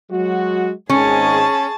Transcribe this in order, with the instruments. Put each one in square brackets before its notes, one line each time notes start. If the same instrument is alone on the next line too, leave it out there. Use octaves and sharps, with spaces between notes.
[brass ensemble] F#3 G#3 F#4
[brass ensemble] G#1 G#2 [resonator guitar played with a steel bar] C#4 [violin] G#4 A5